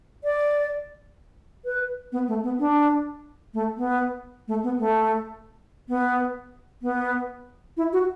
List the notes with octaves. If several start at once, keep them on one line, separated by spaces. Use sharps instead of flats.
D5
B4
B3
A3
B3
D4
A3
B3
A3
B3
A3
B3
B3
E4
F#4